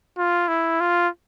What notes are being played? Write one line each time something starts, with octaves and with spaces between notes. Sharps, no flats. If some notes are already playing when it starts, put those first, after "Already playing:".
F4
E4
F4